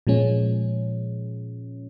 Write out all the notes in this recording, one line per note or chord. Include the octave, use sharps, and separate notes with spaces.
A#2 F3 G#3 C#4